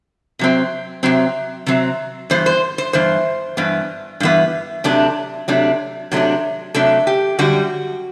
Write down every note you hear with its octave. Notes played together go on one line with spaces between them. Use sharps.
C3 F#3 C4
C3 F#3 C4
C3 F#3 C4
G2 E3 B3 C5
C5
C5
G2 E3 B3 C5
G2 E3 B3
G2 E3 B3
C3 F#3 A3 D4
C3 F#3 A3 D4
C3 F#3 A3 D4
C3 F#3 A3 D4 A4
G4
F#2 D3 G3 F#4